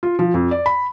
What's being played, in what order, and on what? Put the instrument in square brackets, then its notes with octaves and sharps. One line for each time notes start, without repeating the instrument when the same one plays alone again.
[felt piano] F4
F3
F2
D5
B5